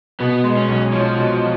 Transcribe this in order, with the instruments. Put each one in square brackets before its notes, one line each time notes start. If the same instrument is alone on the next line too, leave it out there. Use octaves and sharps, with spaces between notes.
[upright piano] B2 [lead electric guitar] B3
[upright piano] G#3
[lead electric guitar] C#4
[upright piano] B1
[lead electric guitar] F3 [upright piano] C#4
[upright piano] B2